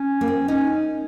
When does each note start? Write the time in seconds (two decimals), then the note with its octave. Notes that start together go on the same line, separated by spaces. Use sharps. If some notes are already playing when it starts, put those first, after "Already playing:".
Already playing: C#4
0.21 A#3
0.28 C4
0.48 C#4 D#4